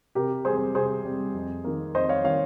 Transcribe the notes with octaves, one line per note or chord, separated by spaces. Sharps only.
C3 G4 A#4
G3 C4 G#4 C5
C3 G#4 C5
G3 C4
F2
D#3 A#3
F2 C5 D#5
C#5 F5
D#3 A#3 C#5 F5